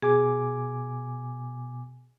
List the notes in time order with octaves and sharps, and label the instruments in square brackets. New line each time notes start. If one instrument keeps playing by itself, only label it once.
[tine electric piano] B2 G#5 D6 [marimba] G#4